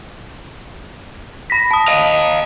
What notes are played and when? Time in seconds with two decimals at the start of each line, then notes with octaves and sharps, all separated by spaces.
1.50 B5 A#6 B6
1.71 A5 D#6
1.88 D#5 F5